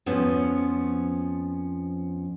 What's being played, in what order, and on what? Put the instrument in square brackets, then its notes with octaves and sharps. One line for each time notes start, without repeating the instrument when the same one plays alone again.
[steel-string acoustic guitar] F2 F3 B3 C#4